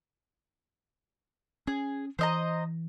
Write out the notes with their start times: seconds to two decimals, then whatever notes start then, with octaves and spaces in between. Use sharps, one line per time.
1.67 C#4 G#4
2.19 E3 C5 D#5 A#5